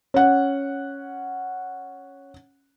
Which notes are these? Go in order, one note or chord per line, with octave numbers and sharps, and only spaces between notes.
C#4 F#5